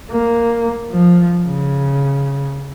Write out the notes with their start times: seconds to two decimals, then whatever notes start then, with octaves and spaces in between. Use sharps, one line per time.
0.11 A#3
0.92 F3
1.46 C#3